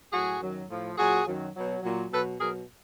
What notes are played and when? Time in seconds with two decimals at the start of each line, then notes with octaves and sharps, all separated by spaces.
0.11 A2 F#3 F#4 G#4
0.40 F#2 D#3 F#3
0.69 A2 F3
0.97 A#2 F#3 F#4 G#4
1.27 F#2 D#3 F#3
1.55 B2 F#3
1.83 A#2 F#3
2.11 B2 F#3 A4 B4
2.40 B2 F#3 G#4 A#4